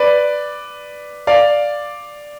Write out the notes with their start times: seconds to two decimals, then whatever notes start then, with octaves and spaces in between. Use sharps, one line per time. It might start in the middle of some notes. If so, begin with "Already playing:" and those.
Already playing: B4 D5
1.27 D5 F5